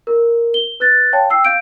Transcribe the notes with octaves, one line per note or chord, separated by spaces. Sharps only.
A#4
G7
B4 F#6 A6
C#5 F5 G5 A5
G5 E6 C7
F5 G6 D7